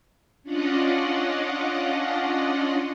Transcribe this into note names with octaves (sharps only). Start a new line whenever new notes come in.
C#4 D4 F4 D5 D#5 F#5